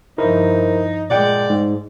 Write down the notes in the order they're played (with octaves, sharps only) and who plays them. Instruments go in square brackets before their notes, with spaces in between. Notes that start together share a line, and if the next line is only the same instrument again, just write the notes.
[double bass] G2 F3 [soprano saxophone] D#4 [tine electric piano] E4 A#4 C5
[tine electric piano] A#2 F#5 G5 [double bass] G#3 [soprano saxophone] D5
[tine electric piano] G#2